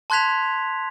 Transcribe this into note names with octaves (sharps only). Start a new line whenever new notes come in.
A5 C6 F#6 G#6 B6 F7